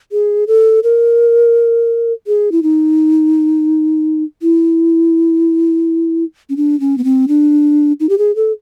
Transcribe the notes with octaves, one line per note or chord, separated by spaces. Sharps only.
G#4
A4
A#4
G#4
E4
D#4
E4
C#4
D4
C#4
B3
C4
D4
D#4
G4
G#4
A4